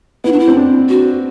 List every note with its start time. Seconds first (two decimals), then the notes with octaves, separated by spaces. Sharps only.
0.24 B3 E4
0.32 D4
0.39 E4
0.48 C4
0.56 D4
0.89 F#4